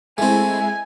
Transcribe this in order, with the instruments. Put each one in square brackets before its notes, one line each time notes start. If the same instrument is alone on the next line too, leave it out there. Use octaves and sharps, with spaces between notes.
[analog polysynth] G#3 E4 [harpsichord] A3 C4 [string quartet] G#5